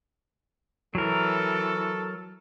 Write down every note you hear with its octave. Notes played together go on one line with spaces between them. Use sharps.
E3 F#3 A4 A#4